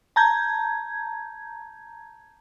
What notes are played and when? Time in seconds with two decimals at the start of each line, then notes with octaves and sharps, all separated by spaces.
0.16 A5 A#5 G6 G#6